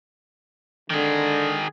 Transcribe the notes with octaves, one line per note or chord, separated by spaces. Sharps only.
D3 D#3 G#4